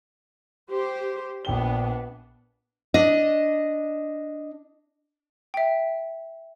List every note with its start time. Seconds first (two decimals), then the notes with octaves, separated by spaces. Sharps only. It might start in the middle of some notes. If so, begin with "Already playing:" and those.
0.70 G4 C5
1.45 A#1 B3 D4 G5 G7
2.94 D4 D#5
5.54 E5 G5